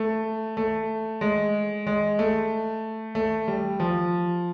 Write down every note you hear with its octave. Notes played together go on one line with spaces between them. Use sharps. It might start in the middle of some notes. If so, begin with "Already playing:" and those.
Already playing: A3
A3
G#3
G#3
A3
A3
G3
F3